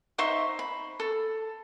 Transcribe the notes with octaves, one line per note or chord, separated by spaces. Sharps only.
D#4 C5 E5 C#6
B5
A4